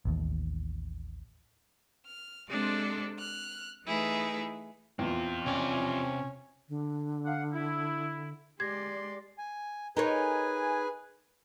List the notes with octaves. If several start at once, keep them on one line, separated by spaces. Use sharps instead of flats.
A1 D#2
F6
C3 G#3 C4 D4 A4 D5
F6 F#6
E3 A3 D#4 E4 G#4 B4
E2 A#2 C4 F4
C3 C#4 D5
D3
F5 F#5
E4
G#3 G4 D5 C6 G#6 A#6
G#5
D#4 G#4 A#4 B4 C#5 G#5